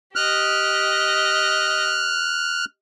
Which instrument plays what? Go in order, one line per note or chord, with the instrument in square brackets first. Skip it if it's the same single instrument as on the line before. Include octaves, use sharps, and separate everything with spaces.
[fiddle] G4 D#5 [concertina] F6 F#6